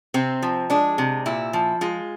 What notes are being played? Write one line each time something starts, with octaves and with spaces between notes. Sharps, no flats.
C3 C4
F3
G#3 D4
C3
A#2 E4
F3
G#3 F4